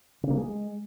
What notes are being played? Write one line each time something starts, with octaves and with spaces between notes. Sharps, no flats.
C#3
A#3
G#3